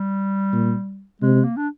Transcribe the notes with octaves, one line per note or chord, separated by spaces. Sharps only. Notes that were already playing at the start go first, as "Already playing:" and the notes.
Already playing: G3
A#2
C3 G#3
A#3
D4